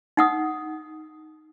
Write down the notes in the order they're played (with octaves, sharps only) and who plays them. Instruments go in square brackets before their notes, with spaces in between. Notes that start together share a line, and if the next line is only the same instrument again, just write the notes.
[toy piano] D#4 F#5 D#6